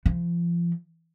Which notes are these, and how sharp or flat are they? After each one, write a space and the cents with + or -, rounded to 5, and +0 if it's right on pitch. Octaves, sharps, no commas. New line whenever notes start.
F3 -30